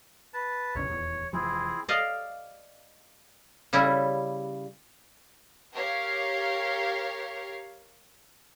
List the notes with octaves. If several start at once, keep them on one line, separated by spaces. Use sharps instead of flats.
B4 A5
A#1 E2 C#3 C#5
D#1 E2
F1 E3 F3 C4 E4 G#4
D5 D#5 F5
C#3 G3 E4
G4 A#4 C#5 F5